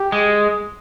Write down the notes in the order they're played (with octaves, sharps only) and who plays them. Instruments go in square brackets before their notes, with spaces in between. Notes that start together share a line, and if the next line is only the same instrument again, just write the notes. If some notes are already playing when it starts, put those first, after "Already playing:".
Already playing: [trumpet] G4
[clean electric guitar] G#3